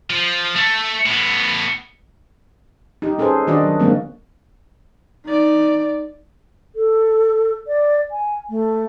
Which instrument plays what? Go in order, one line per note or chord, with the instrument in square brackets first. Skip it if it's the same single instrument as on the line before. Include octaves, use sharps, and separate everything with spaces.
[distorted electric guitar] F3
A3
A2 B3
[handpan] D#4 G4
C#4 G#4 A4 B4 C5
D#3 D4 F#4 D5 D#5
F#3
D3 F#3 G#3 A#3 C4
[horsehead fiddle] D#4 D5
[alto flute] A4
D5
G#5
A3